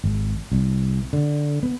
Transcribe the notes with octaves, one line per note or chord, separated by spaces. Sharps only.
G#1
C2
D3
B3